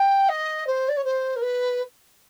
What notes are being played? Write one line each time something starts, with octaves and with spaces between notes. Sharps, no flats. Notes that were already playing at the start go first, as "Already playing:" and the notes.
Already playing: G5
D#5
C5
D5
C#5
C5
A#4
B4